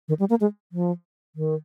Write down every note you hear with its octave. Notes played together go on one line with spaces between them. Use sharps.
D#3
G3
A#3
G#3
F3
D#3